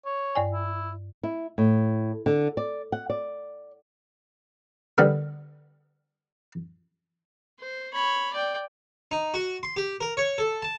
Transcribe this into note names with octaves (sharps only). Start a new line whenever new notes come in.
C#5
G2 D5 G#5
E4
E4
A2
D3
D5
F#5
D5
D3 G3 B3 A#4 B4
C5
C#5 B5
D5 G5
D#4
F#4
C6
G4
A#4
C#5
A4
A5